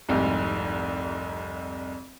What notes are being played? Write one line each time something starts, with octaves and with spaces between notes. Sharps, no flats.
F1 C2 G#2